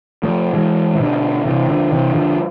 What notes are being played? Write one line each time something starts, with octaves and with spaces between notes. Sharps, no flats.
F3 A3
E3 G#3
E3
B2 D3
C3 E3
D3 F3
C3 E3
D3 F3